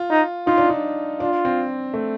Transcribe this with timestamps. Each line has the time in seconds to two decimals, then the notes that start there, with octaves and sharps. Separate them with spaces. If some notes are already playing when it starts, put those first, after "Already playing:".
Already playing: F4
0.10 D#4
0.47 D#4 F4
0.58 D4
0.69 D#4
1.20 D4 F4
1.45 C4
1.94 A3